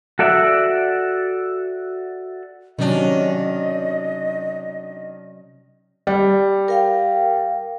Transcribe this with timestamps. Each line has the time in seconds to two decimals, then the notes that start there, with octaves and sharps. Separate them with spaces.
0.19 F#4 A4 D5 E5 F#5
2.79 C3 D#3 F#3 C#4 D4 D#5
6.07 G3
6.68 A#4 F5 G5